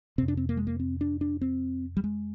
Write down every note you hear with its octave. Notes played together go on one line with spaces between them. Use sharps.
F2 C3 C4
D4
C4
A#3
G#3
A#3
C4
D4
D4
C4
G3
G#3